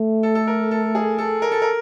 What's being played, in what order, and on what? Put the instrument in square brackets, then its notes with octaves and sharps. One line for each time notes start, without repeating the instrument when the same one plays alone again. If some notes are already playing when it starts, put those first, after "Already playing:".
Already playing: [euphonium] A3
[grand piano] A4
A4
A#4
A4
G#4
A4
A#4
A4
A#4